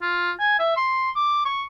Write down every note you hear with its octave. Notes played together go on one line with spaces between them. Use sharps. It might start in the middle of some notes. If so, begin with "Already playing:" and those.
F4
G#5
E5
C6
D6
C#6